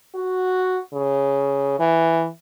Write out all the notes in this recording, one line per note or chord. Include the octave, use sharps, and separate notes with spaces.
F#4
C#3
E3